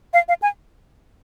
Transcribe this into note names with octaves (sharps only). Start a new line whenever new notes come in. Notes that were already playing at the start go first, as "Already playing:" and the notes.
F5
F5
G#5